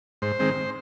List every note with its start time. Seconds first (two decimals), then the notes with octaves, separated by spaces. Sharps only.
0.22 G#2 C5
0.39 D#3 G#3 C4